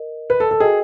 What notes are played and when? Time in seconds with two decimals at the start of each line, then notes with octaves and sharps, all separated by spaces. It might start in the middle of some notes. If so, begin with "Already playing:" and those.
Already playing: A#4 D#5
0.30 B4
0.40 A4
0.51 A4
0.60 F#4 G#4 A#4 D#5 G5